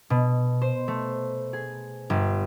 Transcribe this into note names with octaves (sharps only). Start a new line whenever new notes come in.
B2
C5
A3
G#4
G1